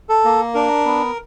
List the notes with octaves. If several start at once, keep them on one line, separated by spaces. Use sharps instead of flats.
A4
A#3
D4 A#4
B3